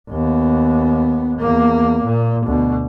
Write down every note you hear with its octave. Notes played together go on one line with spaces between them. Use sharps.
D#2 B3
E2 A#3
A#2
D2 B2